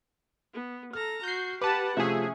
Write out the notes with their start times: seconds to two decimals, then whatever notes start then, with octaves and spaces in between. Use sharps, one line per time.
0.54 B3
0.93 A4 A#5 F6
1.23 F#4 G6 C7
1.61 G4 B4 F#5 A5 D6
1.97 C3 F3 A3 C#4 G#4 E5